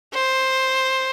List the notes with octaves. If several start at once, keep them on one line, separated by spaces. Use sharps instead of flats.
C5